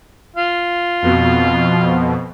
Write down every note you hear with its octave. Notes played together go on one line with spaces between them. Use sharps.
F4
F2 B2